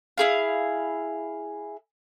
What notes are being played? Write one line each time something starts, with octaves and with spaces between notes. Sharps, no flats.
E4 G#4 F5